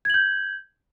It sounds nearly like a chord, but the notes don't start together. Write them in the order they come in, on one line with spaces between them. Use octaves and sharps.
G#6 F#7 G6